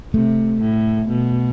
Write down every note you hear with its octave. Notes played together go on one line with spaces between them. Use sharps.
C3 A3
A2
B2